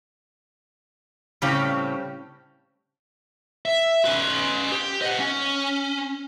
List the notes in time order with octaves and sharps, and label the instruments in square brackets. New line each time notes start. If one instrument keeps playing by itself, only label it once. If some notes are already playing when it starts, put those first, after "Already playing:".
[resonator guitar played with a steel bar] A2 C#3 G3 C4 C#4
[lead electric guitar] E5
C#4 B4
G4
D#5 F#5
C#4